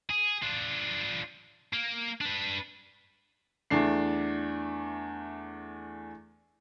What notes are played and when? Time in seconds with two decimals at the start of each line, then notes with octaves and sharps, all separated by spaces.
0.10 G#4
0.42 D4 F4
1.73 A#3
2.21 D4 B4
3.70 E2 A3 D4 C7